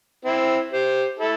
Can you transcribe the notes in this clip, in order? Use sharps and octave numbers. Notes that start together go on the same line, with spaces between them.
C4 E4
G4 C5
E4 A4